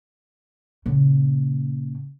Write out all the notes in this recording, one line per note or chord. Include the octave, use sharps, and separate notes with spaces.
A#2 C#3